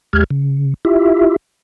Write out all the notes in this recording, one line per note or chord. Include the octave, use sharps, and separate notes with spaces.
D#2 G#3 G4 F6 G#6
C#3
E4 F4 G4 E5